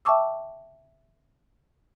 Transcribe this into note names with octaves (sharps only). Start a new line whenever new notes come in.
E5 G5 A5 C#6 D6 E6